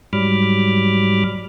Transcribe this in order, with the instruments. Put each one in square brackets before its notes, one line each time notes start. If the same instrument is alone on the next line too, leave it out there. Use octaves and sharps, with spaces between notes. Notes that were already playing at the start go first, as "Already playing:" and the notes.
[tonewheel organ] G#2 F#3 G3 B5 D6 F6